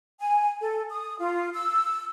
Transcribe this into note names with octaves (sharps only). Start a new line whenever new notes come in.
G#5
A4
D#6
F4
E6